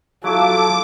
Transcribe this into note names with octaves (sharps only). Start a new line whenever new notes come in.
F#3 E4 F4 A4 D6